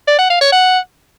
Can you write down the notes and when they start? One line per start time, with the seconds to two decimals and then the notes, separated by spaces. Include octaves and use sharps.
0.07 D5
0.19 F#5
0.30 F5
0.41 C#5
0.52 F#5